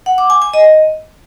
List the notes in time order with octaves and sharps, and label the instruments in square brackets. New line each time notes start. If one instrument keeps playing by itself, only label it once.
[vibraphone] F#5
D6
G#5
G#5
D#5